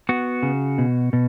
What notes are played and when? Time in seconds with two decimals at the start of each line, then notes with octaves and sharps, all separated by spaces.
0.09 B3 F#4
0.43 C#3
0.78 B2
1.13 B2